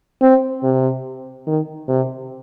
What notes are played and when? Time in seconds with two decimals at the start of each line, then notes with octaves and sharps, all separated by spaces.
0.22 C4
0.63 C3
1.47 D#3
1.88 C3